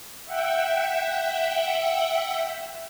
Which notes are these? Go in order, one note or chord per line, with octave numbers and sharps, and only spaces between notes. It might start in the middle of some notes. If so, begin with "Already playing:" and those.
E5 F#5 G5